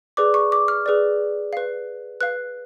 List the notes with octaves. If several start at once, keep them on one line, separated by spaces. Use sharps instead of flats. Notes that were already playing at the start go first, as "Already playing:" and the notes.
G#4 B4 D5 D6
C#6
D6
F6
G#4 B4 D5
B4 F5
B4 F5 F#6